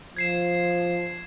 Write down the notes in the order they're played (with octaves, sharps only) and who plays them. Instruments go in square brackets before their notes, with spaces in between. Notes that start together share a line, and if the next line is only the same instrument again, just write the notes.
[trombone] F3 [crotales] G#6 C7 E7